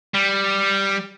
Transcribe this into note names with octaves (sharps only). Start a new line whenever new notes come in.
G3